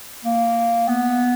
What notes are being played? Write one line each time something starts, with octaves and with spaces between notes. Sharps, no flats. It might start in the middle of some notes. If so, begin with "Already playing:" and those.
A#3
B3